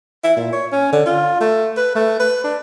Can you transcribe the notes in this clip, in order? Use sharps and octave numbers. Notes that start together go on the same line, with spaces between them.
E4
A#2
C#5
C#4
D3
F4
A3
B4
A3
B4
D4